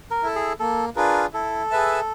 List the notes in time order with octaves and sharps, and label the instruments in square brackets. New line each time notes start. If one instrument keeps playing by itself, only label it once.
[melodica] A#4
[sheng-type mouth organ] E4 A4
[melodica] G#4
[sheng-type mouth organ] A#3 [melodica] A4
[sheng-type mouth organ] D4 F4 G#4 B4 [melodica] A#4
[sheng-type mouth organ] E4 [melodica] A4
[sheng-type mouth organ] G#4 B4 E5 A5